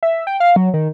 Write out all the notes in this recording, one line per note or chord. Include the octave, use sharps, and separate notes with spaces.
E5
G5
F5
F#3
D#3